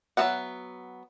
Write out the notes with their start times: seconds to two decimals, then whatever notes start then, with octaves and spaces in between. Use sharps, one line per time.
0.17 F#3 B3 C#4 E5 F#5